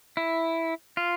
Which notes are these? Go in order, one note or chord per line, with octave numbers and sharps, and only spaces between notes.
E4
F4